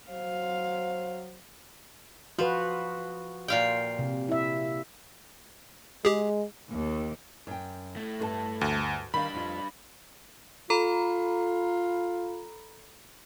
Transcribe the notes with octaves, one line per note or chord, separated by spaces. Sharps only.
F#3 C5 F5
F3 F#4 B4
A#2 F5 G5
C3
E4 E5
G#3 G4 G#4
D#2
F#2 G5
A3 E4
G2 A#4 A5
D2
D#3 G3 D4 F5 B5
F2 F4
F4 A4 A#5 B5